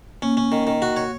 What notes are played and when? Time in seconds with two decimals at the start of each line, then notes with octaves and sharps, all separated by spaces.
0.22 A#3 C#4
0.37 C#4
0.52 D#3
0.67 D#3
0.82 F#4
0.96 C#5